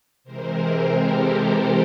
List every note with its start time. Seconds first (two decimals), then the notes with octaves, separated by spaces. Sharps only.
0.24 C3 E3 G#3 C4 A#4 C5
0.94 G4 A4